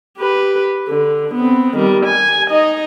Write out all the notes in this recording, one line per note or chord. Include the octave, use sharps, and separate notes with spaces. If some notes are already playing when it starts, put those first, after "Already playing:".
G4 B4
D3
B3 C4
D#3 G3
G#5
D#4 D#5